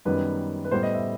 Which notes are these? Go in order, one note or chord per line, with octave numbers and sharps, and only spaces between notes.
F#2 D#3 G3 B3 B4
B4
A2 G3 B3 C5
D#5
E5